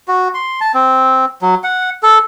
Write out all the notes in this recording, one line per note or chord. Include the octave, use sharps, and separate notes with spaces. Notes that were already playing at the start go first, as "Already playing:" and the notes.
F#4
C6
A5
C4
F#3
F#5
A4